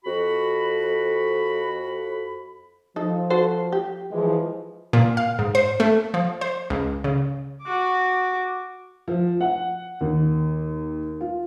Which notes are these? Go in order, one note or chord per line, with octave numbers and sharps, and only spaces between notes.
F2 F#4 B5
F3 D#4 A4
F#4 A4 C5
G4
E3 F3 G#3
A#2
F5
G#2
C5
A3
F3
C5
C#2
C#3
F#4 D6
F3
F#5
D#2
F4